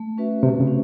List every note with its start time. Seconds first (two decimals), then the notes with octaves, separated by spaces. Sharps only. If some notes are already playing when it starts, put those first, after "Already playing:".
Already playing: A3
0.18 C#4 F#4 B4 E5
0.43 C3 A3
0.60 C#3
0.68 C#4